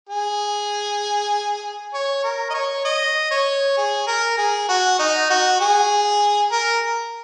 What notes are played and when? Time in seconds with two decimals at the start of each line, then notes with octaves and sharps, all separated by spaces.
0.09 G#4
1.94 C#5
2.24 A#4
2.50 D#5
2.54 C#5
2.85 D#5
3.31 C#5
3.77 G#4
4.07 A#4
4.38 G#4
4.69 F#4
4.99 D#4
5.30 F#4
5.61 G#4
6.52 A#4